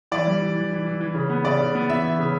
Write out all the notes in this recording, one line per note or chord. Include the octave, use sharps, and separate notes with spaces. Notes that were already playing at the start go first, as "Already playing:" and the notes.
E3 D5
G3
E3
E3
E3
E3
E3
C#3
B3
C#3 D5
C#3
B3
E3 E5
E3
C#3